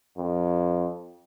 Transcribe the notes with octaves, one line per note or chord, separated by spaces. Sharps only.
F2